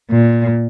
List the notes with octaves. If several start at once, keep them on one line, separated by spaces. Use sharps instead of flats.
A#2